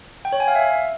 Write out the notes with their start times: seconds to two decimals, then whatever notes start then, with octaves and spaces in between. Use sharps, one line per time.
0.25 G5
0.33 C#5
0.40 G#5
0.48 F5
0.55 E5